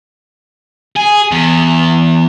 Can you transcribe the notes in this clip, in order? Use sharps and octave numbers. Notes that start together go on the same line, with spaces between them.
G#4
E2